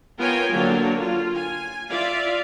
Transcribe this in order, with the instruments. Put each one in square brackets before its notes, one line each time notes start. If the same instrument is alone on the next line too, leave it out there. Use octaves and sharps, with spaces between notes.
[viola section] B3 F4 A#4 C#5 G5 G#5
D3 F#3 A#3 C#5
F4
G#5
F4 D5 E5 F5